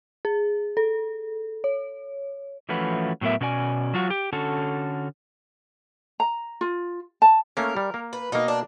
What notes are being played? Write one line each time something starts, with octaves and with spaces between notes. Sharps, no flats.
G#4
A4
C#5
E3 F3 A3 C#4 F#4 B4
A2 F#3 B3 A#4 E5
B2 C#4 F#4 D5 G#5
F#3 F4 F#4
G4
D3 C#4 F#4 A4
A#5
F4
A5
A3 A#3 C#4 A#4
G3
A#3
B4
B2 A#3 D#4
D4